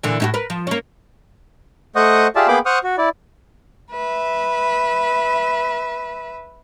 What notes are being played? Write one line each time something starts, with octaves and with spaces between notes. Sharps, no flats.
A#2 D3 E3
A2 D#4 F#4
A#4 B4
F3
A#3 C#4
A3 C5 D#5 F#5 C#6 D#6
F4 G4 G#4 D5 E5 A5
A#3 B3 G#4 G5 B5 D6
C5 F#5 C#6 D#6 F6
F#4
E4 D5
B4 E5